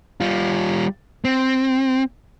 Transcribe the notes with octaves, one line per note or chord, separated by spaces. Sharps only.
G3 F4
C4